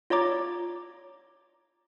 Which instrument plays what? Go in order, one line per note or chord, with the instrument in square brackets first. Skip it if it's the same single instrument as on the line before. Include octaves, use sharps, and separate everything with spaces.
[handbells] F4 C#5 D5 A#5 D6